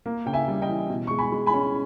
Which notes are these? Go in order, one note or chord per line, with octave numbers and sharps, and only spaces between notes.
A#3
C#3 G5
E5 G#5
G3
D#5 G5
E3
B2
G#3 C#6
G#5 B5
G#3
G#5 B5
C#4